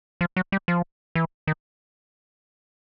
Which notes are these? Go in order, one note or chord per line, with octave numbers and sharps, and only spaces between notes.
F3
F#3
G3
F3
E3
D#3